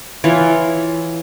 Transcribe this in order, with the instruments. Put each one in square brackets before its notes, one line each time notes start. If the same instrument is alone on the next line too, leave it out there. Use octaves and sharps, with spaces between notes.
[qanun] E3 F4 C#5